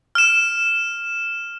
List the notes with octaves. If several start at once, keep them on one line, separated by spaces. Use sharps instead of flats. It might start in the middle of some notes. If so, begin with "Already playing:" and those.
F6 E7